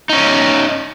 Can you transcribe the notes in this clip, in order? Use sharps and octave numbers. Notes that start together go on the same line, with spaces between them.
C#4 D#4